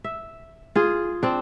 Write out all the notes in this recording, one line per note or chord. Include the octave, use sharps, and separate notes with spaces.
E5
F4 G#4
C4 D4